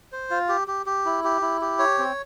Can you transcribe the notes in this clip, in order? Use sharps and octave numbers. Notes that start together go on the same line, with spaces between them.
C5
F4
G4
G4
G4
E4
G4
E4
G4
C#5
C4